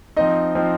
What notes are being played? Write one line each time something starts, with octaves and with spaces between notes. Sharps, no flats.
F3 C4 D#4 D#5
F3 C4 D#4